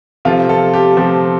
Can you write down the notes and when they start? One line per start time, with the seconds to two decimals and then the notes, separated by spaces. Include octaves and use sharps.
0.25 C3 F3 C4 F4 A4
0.49 F4 A4
0.74 G4
0.97 C3 F3 C4 G4